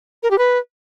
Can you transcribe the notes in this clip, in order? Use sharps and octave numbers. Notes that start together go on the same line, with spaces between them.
A#4
G4
B4